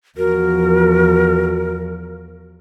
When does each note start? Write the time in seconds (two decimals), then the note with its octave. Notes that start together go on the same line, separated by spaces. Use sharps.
0.18 E2 F3 F#4 A#4